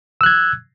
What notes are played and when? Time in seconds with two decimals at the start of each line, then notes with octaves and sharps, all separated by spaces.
0.21 E6
0.23 F#6
0.26 G#6